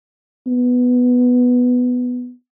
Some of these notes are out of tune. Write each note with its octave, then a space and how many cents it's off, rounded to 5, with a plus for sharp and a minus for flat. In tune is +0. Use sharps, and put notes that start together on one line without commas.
B3 +5